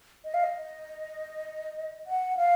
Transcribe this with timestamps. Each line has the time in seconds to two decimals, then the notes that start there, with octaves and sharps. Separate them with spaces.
0.25 D#5
0.34 F5
0.44 D#5
2.07 F#5
2.37 F5